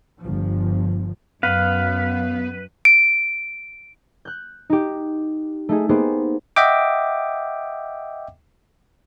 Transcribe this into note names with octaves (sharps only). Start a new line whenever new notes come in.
G1 F3
F#2 B3 B4 F5
D7
F#6 G6
D#4 G4
A3 D#4 G#4
A#3 B3 D#4 G4 G#4 C5
D#5 E5 F#5 G5 D6